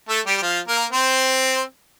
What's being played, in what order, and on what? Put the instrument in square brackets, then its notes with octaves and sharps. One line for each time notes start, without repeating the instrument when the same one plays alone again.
[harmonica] A3 A4
G3 G4
G4
F3 F4
A#3 A#4
C4 C5